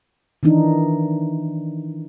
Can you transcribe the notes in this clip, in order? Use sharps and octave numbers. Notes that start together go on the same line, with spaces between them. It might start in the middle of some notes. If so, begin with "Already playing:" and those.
D#3 E3 D4 D#4